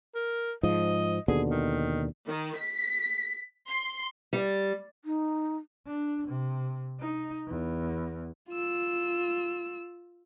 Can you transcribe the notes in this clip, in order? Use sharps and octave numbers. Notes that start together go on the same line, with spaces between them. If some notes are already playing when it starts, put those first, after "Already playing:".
A#4
G#2 F3 D#5
D#2 B2 D3 G#4
D#3
D#3
B6
C6
G3
D#4
D4
C3
D#4
E2
F4 E6